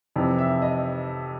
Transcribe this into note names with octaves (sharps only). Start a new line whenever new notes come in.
F2 C3 E3
E5
D#5